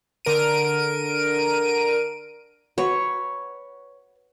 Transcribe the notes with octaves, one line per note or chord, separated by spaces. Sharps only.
D3 A#4 D7 D#7
F#4 B4 C#5